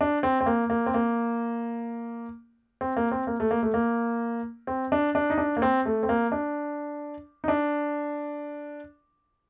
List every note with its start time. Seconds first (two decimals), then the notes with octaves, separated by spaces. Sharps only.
0.01 D4
0.23 C4
0.41 C4
0.46 A#3
0.70 A#3
0.86 C4
0.94 A#3
2.81 C4
2.96 A#3
3.11 C4
3.27 A#3
3.40 A3
3.51 A#3
3.63 A3
3.74 A#3
4.67 C4
4.92 D4
5.15 D4
5.30 D#4
5.38 D4
5.57 A#3
5.62 C4
5.86 A3
6.03 C4
6.09 A#3
6.32 D4
7.44 D#4
7.48 D4